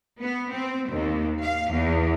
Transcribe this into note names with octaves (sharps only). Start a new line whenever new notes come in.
B3
C4
D#2
F5
E2